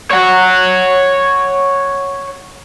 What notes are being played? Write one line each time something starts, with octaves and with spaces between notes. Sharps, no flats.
C#5 F#5